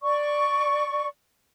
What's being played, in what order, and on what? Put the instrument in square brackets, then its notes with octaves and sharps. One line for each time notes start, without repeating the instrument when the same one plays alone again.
[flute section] D5 C#6